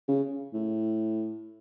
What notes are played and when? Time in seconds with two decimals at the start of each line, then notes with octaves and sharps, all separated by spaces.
0.09 C#3
0.54 A2